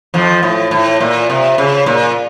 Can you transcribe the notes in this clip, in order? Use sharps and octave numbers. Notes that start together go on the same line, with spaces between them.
F2 F3
A2
A2
A#2
C3
C#3
A#2